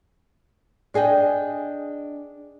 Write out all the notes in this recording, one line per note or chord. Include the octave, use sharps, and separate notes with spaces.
D4 G#4 D#5 G5